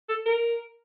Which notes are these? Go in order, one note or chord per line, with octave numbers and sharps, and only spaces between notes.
A4
A#4